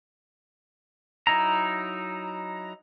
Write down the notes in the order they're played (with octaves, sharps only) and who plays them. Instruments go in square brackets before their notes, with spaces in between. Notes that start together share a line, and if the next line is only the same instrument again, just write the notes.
[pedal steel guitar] F#3 D#4 E4 A#5